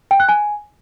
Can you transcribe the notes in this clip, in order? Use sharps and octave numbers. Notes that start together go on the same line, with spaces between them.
G5
F#6
G#5